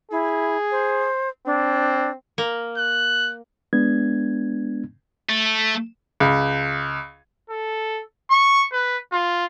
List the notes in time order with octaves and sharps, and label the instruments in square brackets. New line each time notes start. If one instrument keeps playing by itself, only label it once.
[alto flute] E4 [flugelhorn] G#4
[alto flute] C5
[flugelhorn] C4 [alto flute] D4
[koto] A#3
[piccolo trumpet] F#6
[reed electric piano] G#3 B3 D4 G#6
[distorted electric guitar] A3
[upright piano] C#2
[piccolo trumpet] A4
C#6
B4
F4